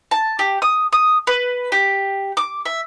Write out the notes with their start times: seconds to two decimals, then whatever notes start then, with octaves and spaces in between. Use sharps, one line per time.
0.11 A5
0.39 G4
0.62 D#6
0.93 D#6
1.27 B4
1.72 G4
2.37 D6
2.65 E5